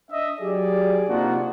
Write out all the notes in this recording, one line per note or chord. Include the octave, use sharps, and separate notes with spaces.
D4 D#5 E5
F#3 G4 G#4 D5
C3 A#3 D4 D#4 F4 F#4